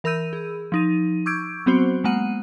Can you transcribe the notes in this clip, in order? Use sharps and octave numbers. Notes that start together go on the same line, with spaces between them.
E3 A#4 B5 E6 G6 D#7
G#4
F3 D#4 D#7
C#6 D6 E6 G6 G#6 D7
F#3 B3 C4 F#4 C5
G#3 A#3 B3 F#5 D#7